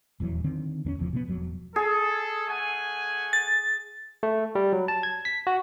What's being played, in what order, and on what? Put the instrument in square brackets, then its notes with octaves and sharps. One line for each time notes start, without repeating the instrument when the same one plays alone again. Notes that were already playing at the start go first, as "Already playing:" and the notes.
[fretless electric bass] D#1 E2 E3 F#3
D3 D#3 C4
E2 A#3 C#4
F1 E2 F3
B2 D#3 B3
E1 F2 F#3
[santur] G#4 [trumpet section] A4
[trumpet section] A3 F#5 G#5
[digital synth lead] A6
[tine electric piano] A3
G3
F#3
A5
G#6
B6
F#4